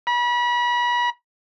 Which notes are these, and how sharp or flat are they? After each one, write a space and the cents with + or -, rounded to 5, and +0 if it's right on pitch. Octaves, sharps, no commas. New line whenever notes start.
B5 -35